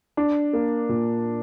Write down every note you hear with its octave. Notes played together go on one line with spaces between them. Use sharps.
D4
A#3
A#2